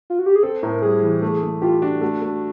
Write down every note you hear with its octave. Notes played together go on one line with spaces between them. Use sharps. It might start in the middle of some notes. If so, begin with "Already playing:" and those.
F4
F#4
G4
G#4
C4 A4
A2 A#4
G3 G#4
E3
A3
A3
F4 G4
D4 F#4
A3 F#4
A3